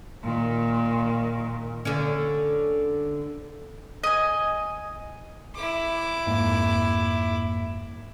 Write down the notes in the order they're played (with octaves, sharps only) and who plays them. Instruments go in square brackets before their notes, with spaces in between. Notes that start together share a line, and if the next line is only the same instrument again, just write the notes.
[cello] A#2 D#3
[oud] D3 C#4
[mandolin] D#5 G#5
[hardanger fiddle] E4 D6
[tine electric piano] F2 G#2 A#3